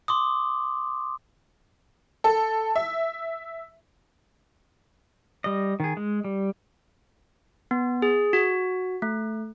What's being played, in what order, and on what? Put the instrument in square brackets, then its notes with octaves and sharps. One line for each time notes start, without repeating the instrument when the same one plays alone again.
[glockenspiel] C6 D6 D#6
[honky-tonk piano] A4
E5
[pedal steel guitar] G3 D#5
D#3 G#4
G#3
G3
[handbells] B3
G#4
F#4
A3